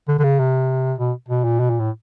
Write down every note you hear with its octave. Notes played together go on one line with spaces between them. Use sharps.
D3
D3
C#3
C3
B2
B2
A#2
B2
A#2
A2